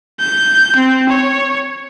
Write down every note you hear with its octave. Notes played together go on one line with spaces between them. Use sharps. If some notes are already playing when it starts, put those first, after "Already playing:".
G6
C4
C#5